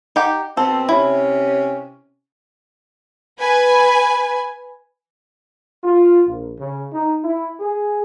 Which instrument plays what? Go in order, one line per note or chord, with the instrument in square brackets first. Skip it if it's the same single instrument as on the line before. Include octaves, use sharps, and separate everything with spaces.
[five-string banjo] D#4 G4 F#5
[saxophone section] B2 C4 [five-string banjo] A4
[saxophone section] C3 C#4 [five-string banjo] E4
[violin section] B4 G#5
[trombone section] F4
A#1
C#3
D#4
E4
G#4